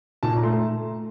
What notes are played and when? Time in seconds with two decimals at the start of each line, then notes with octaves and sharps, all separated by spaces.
0.23 A#2 A5
0.37 A#5
0.43 A3 C6